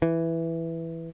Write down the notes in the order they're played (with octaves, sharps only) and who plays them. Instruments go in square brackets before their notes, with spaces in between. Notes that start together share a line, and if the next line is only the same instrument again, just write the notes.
[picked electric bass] E3